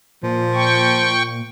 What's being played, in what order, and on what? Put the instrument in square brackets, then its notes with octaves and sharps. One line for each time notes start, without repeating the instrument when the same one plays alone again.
[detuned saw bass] A#2 [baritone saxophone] F3
[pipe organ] G5 C#6